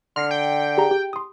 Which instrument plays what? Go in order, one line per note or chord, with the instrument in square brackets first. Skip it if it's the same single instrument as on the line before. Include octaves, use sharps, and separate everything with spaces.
[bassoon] D3 [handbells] C6 A#6 C7 [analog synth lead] F6
[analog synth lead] G5
[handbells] G4 G#4 A#5
G4
C6 D#6